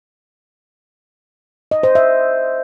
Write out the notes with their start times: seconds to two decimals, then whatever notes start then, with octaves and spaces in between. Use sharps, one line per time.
1.71 D#5
1.83 C5
1.95 E5